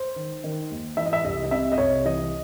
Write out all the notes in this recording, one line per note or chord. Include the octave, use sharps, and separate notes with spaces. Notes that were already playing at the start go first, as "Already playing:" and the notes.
Already playing: C5
D#3
D#3
D#2
E3 E5
D#5
E5
C2 D#5
D#5
C3 E5
D#5
C2 C#5
E3 D#5